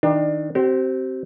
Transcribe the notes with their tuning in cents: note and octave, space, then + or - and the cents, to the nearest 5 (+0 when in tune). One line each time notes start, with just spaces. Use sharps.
D#3 +20 D4 +25
C4 +0 G4 -40